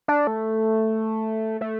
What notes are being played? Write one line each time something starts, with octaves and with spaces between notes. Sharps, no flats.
D4
A3
A3